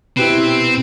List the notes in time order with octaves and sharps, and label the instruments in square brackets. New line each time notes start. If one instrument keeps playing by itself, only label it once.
[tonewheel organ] B2 [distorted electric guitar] C4 [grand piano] E4 G4 B4